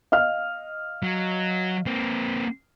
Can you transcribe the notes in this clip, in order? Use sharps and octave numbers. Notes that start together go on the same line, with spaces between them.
D#5 F5 F6
F#3
A#3 C4